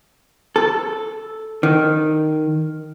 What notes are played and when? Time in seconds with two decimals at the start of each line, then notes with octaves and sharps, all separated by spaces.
0.56 A4
1.63 D#3